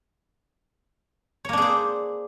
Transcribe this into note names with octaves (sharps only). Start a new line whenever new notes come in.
A#3 D4 G#4 C5 C#5